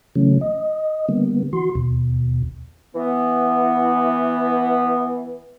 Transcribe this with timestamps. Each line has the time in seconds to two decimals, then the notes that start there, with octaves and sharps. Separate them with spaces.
0.16 C#3 E3 F#3 A3 C#4
0.41 D#5
1.09 D3 G3 A#3 B3
1.53 E3 F#4 C6
1.75 D#2 B2
2.95 E3 B3